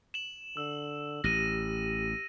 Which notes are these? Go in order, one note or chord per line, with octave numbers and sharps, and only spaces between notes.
E7 F#7
D3 E6
A1 G4 A#6 D#7